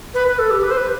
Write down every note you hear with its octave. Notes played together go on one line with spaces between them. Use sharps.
B4
B4
A4
G4
B4
C5
B4